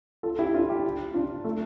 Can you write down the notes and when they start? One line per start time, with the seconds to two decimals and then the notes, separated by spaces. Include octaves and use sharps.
0.23 F4 A4
0.39 E4 G4
0.54 D4 F4
0.69 E4 G4
1.14 D4 F4
1.44 A3